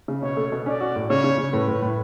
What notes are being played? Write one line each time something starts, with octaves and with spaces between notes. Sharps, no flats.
C#3
B2 C#5
A3
B2
C#4 D5
F#4
A2
C#3 C#5
C#3
C#3
A2 B4
A2
A2